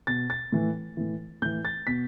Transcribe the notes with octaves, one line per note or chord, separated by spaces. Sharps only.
B2 A6
A6
A2 E3
A2 E3
A2 E3 G6
A6
B2 B6